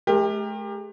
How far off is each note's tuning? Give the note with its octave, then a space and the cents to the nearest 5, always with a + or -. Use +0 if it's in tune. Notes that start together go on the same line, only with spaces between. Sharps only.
A3 -45 G4 +30 A#4 +0